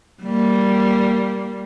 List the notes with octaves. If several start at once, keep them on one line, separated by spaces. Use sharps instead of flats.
G3 A#3